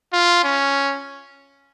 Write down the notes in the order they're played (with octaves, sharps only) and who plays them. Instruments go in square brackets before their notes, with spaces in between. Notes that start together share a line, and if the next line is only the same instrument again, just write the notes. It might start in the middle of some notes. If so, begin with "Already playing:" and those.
[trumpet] F4
C#4